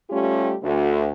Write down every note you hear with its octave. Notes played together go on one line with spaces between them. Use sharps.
G3 A3 C#4 F4 G4
D2